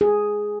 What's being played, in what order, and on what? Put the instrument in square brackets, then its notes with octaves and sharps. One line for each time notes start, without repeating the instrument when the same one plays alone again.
[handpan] G#4